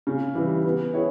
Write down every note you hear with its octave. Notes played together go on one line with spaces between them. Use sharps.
C#3
E3 G3
B3
E4 G#4 C#5